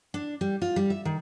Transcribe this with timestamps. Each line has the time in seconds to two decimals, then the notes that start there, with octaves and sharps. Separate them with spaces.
0.14 D4
0.41 G3
0.62 F4
0.76 G3
0.90 E5
1.05 D#3